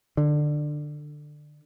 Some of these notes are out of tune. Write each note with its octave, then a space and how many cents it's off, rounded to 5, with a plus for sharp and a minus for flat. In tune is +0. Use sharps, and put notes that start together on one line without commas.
D3 +20